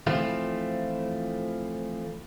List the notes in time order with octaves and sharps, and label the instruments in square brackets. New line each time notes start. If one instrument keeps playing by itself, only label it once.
[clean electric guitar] E3 F3 A3 C4 F4